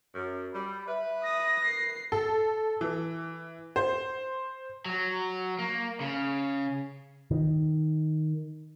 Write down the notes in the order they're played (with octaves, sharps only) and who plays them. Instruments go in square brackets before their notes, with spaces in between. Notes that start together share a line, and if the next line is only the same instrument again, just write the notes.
[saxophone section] F#2
[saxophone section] G3 [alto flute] B5
[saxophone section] B4 [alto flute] E5
[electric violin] D#6 [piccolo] A#6
[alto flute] A#4 [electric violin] C7
[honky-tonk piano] A4
E3
C5
[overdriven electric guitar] F#3
A#3
C#3
[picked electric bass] D#3